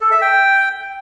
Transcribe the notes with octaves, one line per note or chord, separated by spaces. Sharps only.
A4
E5
G5